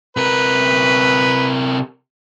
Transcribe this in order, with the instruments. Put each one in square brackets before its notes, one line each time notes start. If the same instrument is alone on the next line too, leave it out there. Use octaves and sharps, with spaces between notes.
[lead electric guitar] C3 A#4 [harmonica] B4